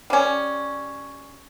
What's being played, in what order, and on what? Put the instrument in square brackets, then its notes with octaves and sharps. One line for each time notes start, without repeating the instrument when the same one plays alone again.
[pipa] G3 C#4